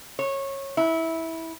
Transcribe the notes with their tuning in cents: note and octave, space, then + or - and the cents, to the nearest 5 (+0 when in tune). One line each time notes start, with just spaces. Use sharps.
C#5 -20
E4 -15